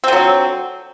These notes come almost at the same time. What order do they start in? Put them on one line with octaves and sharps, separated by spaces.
C4 D3 F#3